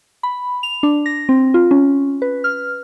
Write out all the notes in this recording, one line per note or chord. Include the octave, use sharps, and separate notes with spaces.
B5
F7
D4
A#6
C4
F4
C#4
B4
F6